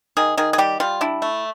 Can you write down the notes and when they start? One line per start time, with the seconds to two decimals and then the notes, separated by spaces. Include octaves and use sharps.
0.17 D#3 G#4
0.37 D#3 G#4
0.53 G#4
0.58 G3 G4
0.80 G3 F4
1.01 D4 E4
1.22 A3